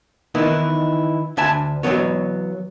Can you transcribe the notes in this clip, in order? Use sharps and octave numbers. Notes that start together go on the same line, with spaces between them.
D#3 E3 B3 D#4 E4
D2 D4 E5 G#5 A5 B5
E3 F#3 G#3 B3 C#5